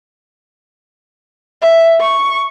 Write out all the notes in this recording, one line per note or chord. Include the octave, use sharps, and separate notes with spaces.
E5
C#6